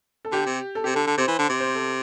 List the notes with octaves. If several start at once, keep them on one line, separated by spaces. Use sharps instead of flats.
A4
D3 G4
C3
A4
C3 G4
D3 A4
D3
C3 C5
E3
D3
C3
C5
A4